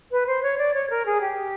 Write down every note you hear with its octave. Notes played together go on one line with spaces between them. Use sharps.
B4
C5
C#5
D5
C#5
A#4
G#4
G4